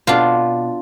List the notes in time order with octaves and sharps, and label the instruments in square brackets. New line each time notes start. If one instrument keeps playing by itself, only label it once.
[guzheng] B2 D4 F4